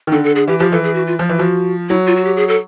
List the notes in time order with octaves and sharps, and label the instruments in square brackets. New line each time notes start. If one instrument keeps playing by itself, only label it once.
[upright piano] D#3
[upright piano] D3 [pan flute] A4
[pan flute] A4
G#4
[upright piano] E3 [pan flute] G4
[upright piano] F3 [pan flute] G4
[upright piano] E3 [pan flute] A4
[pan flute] G#4
F#4
F4
[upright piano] F3 [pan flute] F4
[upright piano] E3
[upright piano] F3 [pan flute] F#4
[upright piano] F#3 [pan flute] E4
[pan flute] F4
F#4
G4
G#4
A4